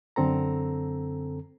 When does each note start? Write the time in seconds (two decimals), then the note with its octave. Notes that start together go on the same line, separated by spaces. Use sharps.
0.16 F#2 D3 C4 A4 A#5